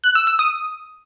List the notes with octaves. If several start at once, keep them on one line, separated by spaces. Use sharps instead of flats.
F#6
E6
E6
D#6